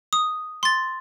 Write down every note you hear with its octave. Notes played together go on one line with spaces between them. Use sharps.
D#6
C6 A6